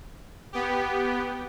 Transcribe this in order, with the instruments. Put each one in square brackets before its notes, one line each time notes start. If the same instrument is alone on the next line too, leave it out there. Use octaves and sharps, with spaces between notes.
[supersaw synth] B3 G4